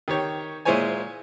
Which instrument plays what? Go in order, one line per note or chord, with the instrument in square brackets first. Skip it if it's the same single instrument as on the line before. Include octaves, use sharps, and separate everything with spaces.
[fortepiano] D#3 G4 C#5
A#2 G#3 E4 C5 C#5 G#5